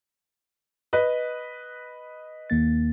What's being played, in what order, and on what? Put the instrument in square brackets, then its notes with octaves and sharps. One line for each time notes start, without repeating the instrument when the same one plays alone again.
[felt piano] B4 D#5
[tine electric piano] D#2 A#3 A6